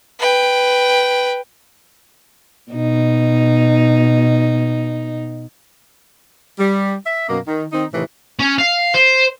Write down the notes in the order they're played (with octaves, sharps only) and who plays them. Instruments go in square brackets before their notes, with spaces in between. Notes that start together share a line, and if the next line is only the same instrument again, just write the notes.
[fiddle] B4 G5
[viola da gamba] B2 D#4
[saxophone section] G3
E5
F#2 B2 A#3
D#3
D#3 C4 D#4
A2 C3 D#3 E3
[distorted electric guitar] C#4
F5
C5